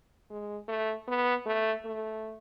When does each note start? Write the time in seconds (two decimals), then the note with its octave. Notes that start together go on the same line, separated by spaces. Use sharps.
0.30 G#3
0.68 A3
1.08 B3
1.46 A3
1.85 A3